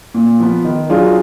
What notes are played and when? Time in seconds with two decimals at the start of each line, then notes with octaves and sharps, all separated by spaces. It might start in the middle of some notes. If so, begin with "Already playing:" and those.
0.14 A#2
0.40 F3 B3
0.65 D#3
0.89 F#3 D4 F4 G#4